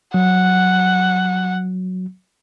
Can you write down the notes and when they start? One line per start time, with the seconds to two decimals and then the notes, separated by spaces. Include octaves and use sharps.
0.14 F#3 F#5